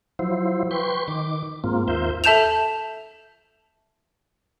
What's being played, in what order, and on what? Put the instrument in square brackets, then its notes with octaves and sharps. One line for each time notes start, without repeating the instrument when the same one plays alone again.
[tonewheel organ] F3 F#3 E4 C5
B4 G5 C6 C#6
D#3 D6
G#2 A#3 C4 F4
D#2 F4 A#4 C5 E5 G6
[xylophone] A4 E5 A5 G6 E7 F7